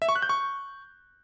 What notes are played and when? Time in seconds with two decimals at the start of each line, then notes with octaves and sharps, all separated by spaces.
0.02 E5
0.09 C#6
0.16 F#6
0.22 G6
0.29 C#6